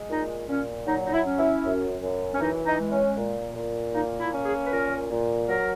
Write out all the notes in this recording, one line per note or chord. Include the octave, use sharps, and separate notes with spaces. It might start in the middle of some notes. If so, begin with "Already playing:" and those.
Already playing: G#3
A#2 D#4
A#2 C#4
F#3 D#4
D#4
E4
C#4
E4
F#2
F#2
C#4
E3 D#4
D#4
G#3
C#4
A#2
A#2
A#3 D#4
E4
C#4
G#4
B4
A#2 A#4
A#2
F#3 A#4